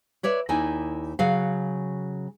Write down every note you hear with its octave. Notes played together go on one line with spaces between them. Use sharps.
B4 C#5 D5 E5
D#2 D#4 E4 D5 G#5
C#3 F#3 F#4 F5